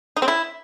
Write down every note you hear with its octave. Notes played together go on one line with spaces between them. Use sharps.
D#4
C4
E4